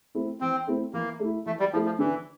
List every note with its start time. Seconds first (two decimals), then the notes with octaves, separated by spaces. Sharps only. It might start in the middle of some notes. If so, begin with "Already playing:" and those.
0.15 A3 C4 E4
0.41 E3 C4
0.67 A3 C4 E4
0.93 E3 A#3
1.20 A3 E4
1.46 E3 A3
1.60 G3
1.73 F3 A3 E4
1.86 F3
1.99 D3 E3